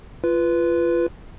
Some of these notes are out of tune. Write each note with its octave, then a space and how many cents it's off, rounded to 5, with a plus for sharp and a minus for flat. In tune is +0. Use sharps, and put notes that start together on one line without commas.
F4 -20 B4 +0